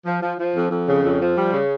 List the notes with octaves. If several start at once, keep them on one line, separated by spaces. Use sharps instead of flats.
F3
F3
F3
F2
F2
C#3
F2
F3
G3
C#3